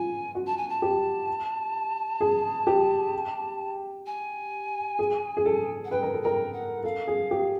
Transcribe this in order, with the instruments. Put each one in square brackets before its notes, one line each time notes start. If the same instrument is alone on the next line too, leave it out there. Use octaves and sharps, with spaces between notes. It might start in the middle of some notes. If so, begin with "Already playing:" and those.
Already playing: [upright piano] F4 [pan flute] G#5
[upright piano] F#4
[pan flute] A5
G#5
A5
[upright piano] G4
G#4
G4
[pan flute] G#5
[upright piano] G#4
G#4
A4
[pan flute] F#5
[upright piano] B4 [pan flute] G5
[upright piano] A#4
A4
[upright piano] A#4 [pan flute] G5
[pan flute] F#5
[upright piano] A4 [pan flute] F5
[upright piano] G#4
G4